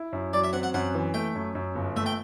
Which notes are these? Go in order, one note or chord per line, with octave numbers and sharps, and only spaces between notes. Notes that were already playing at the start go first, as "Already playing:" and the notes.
Already playing: E4
F#2
F#3 D5
E5
C4 F#5
F#5
F#2 F#5
E3
A3 G5
F#2
F#2
G1
A3 E5
G5